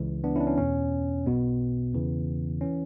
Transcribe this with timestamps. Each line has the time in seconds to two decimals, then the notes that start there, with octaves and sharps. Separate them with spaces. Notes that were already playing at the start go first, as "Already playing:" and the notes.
Already playing: C#2 C#3 E3
0.24 B3 D4
0.36 C#4 E4
0.40 D4
0.47 C#4
0.58 E2 B2 C#4
1.26 B1 B2 B3
1.94 E2 C#3 E3
2.61 E3 C#4